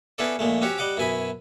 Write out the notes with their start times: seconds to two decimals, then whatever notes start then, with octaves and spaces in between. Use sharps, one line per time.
0.18 B3 C#4 E4 G#4 A4 D5
0.39 A#1 A#2 G#3 A3
0.62 C4 C#4 F#4 G4 C#5
0.78 G3 D#5 F#5 D6
0.97 F#2 B2 E4 G#5 B5 D#6